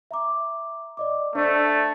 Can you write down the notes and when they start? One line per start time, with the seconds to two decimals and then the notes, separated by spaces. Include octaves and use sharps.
0.11 E5 A#5 D6
0.97 D5 D#5 D6
1.35 A3 D4 C5 D5